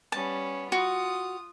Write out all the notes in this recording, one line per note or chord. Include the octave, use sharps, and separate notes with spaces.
G3 B3 C#4 A5
F4 F#4 D#6